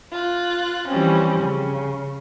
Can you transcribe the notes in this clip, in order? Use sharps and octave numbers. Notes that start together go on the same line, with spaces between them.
F4 F#6
E3 F3 G3 C4 C#4
C#3